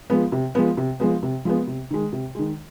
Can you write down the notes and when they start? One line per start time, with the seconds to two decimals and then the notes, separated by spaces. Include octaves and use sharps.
0.10 F3 G#3 B3
0.32 C3
0.55 F3 G#3 B3
0.77 C3
1.00 F3 G#3 B3
1.23 C3
1.45 F3 G#3 B3
1.67 C3
1.90 D#3 G#3
2.13 C3
2.35 D#3 G#3